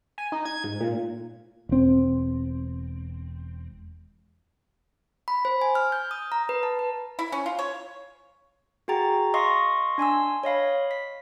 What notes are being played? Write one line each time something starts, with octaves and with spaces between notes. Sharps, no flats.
G#5
D#4
G#6
G#2
A#2
E1 C4
B5
C5
G#5
F6
G6
D#6
A#5
B4
A5
B4
E4
C#4
F4
C#5
F#4 G#4 G5 A#5 A6
D#5 F5 C6 C#6 D#6 A#6
D4 G#5 C6 E6
C#5 D#5 F5 B5
B6